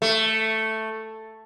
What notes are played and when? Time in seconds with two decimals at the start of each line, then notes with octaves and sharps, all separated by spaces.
0.02 A3